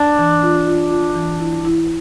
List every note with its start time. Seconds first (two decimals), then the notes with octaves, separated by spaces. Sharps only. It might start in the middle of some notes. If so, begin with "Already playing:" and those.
Already playing: D4
0.19 E3
0.43 F4
0.67 F4
0.91 F4
1.15 E3
1.40 E4
1.65 E4